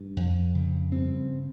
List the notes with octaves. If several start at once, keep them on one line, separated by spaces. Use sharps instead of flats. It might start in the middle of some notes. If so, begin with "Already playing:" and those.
Already playing: G2
F2
C#3
G2 C4